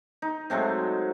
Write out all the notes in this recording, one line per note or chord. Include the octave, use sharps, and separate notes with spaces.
D#4
F#3 G#3 A3 C4